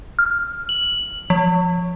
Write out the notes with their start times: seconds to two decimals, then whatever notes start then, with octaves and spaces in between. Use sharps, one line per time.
0.19 F6
0.69 F#7
1.30 F3